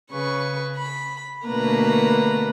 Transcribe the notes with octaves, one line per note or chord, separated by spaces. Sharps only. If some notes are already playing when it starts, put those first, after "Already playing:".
C#3 B4 C#6
B5
B2 D3 A3 A#3 B4 A#5